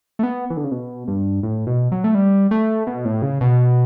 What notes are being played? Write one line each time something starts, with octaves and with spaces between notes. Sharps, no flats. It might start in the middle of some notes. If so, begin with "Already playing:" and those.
A3
B3
E3
D3
C#3
B2
G2
A2
B2
F#3
A3
G3
A3
B2
A2
C#3
B2